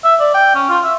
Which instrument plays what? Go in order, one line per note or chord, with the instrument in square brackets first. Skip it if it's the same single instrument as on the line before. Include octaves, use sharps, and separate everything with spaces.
[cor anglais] E5
D5
G5
C#4
F4
E5